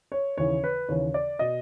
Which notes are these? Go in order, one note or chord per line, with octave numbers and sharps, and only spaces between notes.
C#5
D#2 C#3 E3 C#5
B4
D#2 C#3 E3 C#5
D5
B2 D#5